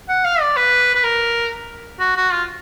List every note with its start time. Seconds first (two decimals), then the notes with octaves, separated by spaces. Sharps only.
0.09 F#5
0.24 F5
0.41 D5
0.56 B4
0.95 B4
1.04 A#4
2.00 F#4
2.16 F#4
2.32 F4